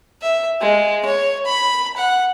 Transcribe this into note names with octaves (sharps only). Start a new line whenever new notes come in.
E5
G#3
C#5
B5
F#5